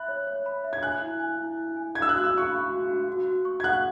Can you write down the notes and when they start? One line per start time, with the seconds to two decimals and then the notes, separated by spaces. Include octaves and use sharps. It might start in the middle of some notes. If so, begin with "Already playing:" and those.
Already playing: E5 B5 F#6
0.08 C#5
0.27 C#5
0.46 B5
0.64 E5
0.73 G#6
0.83 G#5 F#6
1.02 E4
1.20 G#5
1.39 E4
1.57 E4
1.77 G#5
1.95 E5 G#6
2.02 E6
2.09 F#6
2.14 F#4
2.24 E6
2.33 F#4
2.38 C#6
2.51 B5
2.70 F#4
2.88 F#4
3.08 F#4
3.26 F#4
3.45 C#6
3.60 G#6
3.63 F#5 F#6